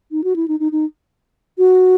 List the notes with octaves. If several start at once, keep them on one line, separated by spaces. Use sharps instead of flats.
D#4
F#4
E4
D#4
D#4
D#4
F#4